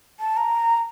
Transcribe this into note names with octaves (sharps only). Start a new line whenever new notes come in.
A5
A#5